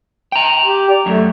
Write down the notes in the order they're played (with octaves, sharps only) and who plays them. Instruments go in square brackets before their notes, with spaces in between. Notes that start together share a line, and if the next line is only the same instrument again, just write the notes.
[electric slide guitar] G5 A#5
[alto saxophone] G4
D5
[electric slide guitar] F#2 [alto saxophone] A3